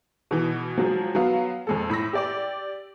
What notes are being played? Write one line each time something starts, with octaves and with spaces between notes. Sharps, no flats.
B2 E3
F3 F#3 G#3
F#3 B3 F5
F2 G#3 A4
A2 B5 E6 A#6
G4 D5 D6